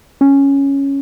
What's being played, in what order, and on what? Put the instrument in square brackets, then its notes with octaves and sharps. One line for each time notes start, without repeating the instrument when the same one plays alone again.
[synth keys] C#4